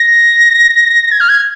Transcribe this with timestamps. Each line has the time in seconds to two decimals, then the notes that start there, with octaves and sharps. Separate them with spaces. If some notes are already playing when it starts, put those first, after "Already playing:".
Already playing: A#6
1.12 G#6
1.21 F6
1.29 G#6